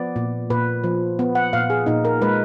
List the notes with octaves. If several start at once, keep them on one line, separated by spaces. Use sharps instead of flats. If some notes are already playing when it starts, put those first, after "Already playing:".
Already playing: F3 B3 D5
A#2
A#2 B4
F3
B3
F#5
A#2 F5
G#4
A#2 D#4
A#4
G#3 B4